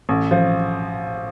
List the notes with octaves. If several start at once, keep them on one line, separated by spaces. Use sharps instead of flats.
A1
F3